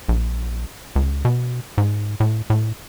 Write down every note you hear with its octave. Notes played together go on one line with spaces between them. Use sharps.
A#1
C#2
B2
G#2
A2
A2